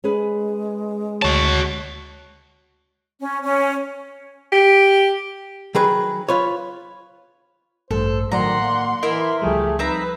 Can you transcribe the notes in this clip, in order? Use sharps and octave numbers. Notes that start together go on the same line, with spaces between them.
G#3 C#4 G#4 B4
D2 F#4 C#5 A5
C#4
C#4
G4
D#3 F#3 G#4 B4
F4 B4 C#5
A1 G2 A3 A4 C5
A2 D#3 F#3 D5 F#5 A#5 C6
A#3
E3 E4 A#4 D#5 C6
C#2 F3 G3 A3 G4 G#4
C4 D#4 B4 E5 A#5